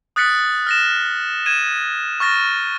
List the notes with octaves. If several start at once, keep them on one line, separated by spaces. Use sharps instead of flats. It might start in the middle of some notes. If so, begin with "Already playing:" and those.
D#6 F#6 A6 B6 C#7 F#7
F6 A#6 E7
G#6 D#7 E7
C#6 F6 A6 A#6